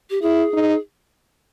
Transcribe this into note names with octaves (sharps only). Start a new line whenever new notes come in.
G4
E4 G#4
D#4